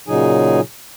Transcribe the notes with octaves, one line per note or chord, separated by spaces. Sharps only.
A#2 C#3 F#3 D#4 G#4 G#5